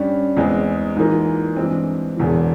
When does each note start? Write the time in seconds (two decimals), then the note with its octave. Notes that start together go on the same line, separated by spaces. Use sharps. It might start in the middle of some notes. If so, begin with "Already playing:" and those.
Already playing: G2 G3 C#4
0.37 E2 E3 G#3 C4
0.96 G#2 E3 A#3 F4
1.56 G2 E3 G#3 C4
2.17 E1 E2 E3